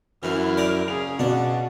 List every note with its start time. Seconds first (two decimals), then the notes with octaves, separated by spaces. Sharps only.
0.23 F#2 E3 E4 F6
0.57 A#4 D5
0.88 C#3 G#4 F7
1.19 B2 D4 F#4